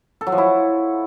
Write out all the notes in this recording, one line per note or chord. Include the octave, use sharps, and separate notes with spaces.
A4
F#3
F3
E4